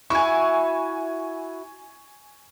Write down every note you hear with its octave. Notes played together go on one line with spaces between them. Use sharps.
E4 F#4 G#5 C#6